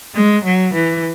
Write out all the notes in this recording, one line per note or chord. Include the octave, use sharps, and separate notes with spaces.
G#3
F#3
E3